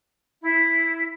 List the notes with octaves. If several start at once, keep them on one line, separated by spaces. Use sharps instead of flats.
E4